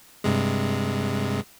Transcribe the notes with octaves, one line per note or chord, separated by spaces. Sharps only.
G2 C3 G#3